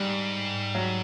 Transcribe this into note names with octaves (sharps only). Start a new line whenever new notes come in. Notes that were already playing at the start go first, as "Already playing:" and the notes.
Already playing: G#2 G3
F#3